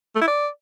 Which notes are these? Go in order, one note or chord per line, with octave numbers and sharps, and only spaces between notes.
A3
E4
D5